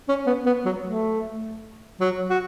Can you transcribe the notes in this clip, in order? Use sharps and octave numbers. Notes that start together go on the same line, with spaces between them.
C#4
B3
B3
F#3
A3
F#3
F#4